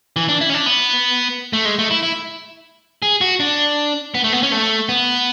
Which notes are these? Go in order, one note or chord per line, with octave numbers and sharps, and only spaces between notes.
E3
D4
E4
C#4
D4
B3
A3
G#3
A3
E4
E4
G#4
F#4
D4
B3
A3
B3
C#4
A3
B3